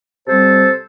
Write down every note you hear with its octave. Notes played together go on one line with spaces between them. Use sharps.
C3 G3 C4 A4 C5